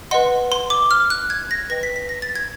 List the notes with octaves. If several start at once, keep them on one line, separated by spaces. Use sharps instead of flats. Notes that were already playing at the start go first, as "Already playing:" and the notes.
B4 D#5 F#5 C6
C6
D6
F6
F#6
G#6
A#6
B4 D#5 G5 A#6
B6
B6
A#6
A6
G#6